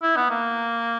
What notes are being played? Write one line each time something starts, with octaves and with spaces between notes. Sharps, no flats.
E4
B3
A#3